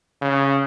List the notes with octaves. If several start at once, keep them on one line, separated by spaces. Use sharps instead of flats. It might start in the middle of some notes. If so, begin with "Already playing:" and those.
C#3